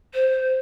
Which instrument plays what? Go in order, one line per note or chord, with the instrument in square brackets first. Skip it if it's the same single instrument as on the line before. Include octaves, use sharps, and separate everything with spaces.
[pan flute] C5